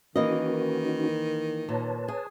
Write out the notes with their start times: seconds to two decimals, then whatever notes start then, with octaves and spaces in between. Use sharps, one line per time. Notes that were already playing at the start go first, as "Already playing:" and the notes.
0.16 D#3 E3 A#3 C#4 D#4 F#4 D#5
1.68 A#2 B4 C#5 A5
2.08 G#4